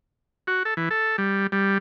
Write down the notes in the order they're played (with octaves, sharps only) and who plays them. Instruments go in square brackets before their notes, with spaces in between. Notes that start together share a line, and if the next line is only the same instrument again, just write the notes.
[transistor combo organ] F#4
A4
E3
A4
G3
G3